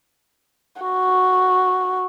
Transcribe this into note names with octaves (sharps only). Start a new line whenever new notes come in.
F#4